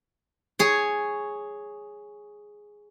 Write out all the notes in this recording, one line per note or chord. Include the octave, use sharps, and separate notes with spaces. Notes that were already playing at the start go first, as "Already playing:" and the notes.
G#4 C#5